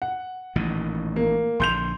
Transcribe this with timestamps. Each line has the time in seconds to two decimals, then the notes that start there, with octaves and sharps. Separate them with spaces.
0.02 F#5
0.56 A1 A#2 D#3
1.16 A#3
1.60 A#1 D3 C6 G6 F7